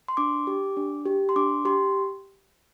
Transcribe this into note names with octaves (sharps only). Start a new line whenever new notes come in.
C6
D4 D6
G4
D4
G4
C6
D4 D6
G4 C6